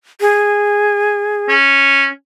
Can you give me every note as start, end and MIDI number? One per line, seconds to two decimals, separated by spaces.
0.21 1.54 68
1.49 2.08 61